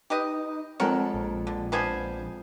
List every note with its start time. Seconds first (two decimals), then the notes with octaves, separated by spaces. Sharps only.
0.10 D#4 G4 B4 D#5
0.80 F2 G#3 C4 A4 A#4 C#5 F#5
1.14 A#1
1.47 D3
1.72 B3 D4 C5 F5 G#5 B5